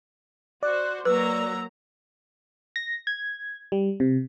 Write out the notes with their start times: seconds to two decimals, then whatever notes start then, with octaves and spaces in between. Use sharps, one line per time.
0.63 F#4 C5 D5 F#6
1.05 F#3 A#3 B4 A#5 E6
2.76 A#6
3.07 G#6
3.72 G3
4.00 C3